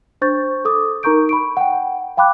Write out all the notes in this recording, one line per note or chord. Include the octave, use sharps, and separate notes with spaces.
D4 C5 C#6 G6 A6
A4 D6 D#6
D#4 A#4 A#5 C#6 G6 D7
B5 C#6 D7
F#5 G5
F5 G5 B5 D6 F#6